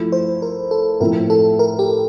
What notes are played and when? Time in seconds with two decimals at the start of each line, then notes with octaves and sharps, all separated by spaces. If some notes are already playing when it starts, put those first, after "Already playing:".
Already playing: F3 A3 E4
0.12 C5
0.42 A#4
0.71 A4
1.00 A2 F3 C4 E4 A#4
1.30 A4
1.59 A#4
1.79 G4